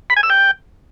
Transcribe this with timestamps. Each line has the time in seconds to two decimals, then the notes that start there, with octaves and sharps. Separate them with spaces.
0.10 B5
0.17 G#5
0.23 E6
0.30 G5